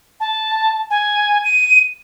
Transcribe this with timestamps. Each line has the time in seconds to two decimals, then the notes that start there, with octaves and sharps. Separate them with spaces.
0.20 A5
0.90 G#5
1.44 D#7